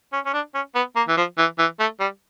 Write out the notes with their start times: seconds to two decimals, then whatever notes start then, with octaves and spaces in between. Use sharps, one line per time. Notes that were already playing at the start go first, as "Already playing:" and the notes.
0.13 C#4
0.26 C#4
0.34 D4
0.55 C#4
0.75 B3
0.96 A#3
1.08 E3
1.17 F3
1.38 E3
1.59 E3
1.80 A3
2.00 G3